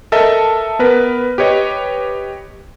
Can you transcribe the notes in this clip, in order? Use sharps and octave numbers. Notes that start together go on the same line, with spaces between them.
A4 A#4 D#5 E5 A5
B3 A#4 B4
G4 B4 C#5 D#5